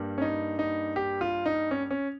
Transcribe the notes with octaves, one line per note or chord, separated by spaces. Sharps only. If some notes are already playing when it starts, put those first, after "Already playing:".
Already playing: G2 G3 A#3
C#4
D#4
D#4
G4
F4
D#4
C#4
C#4